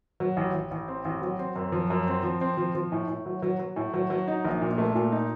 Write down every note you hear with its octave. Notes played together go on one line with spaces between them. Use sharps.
F#3
A1
A1
A1
C4
A1
F#3
C4
F#2
F3
F#2
C4
F3
C4
F3
F3
A2
A2
F#3
F#3
F#3
A2
F#3
F#3
D#4
A#1
A#2
A3
A#2
D#4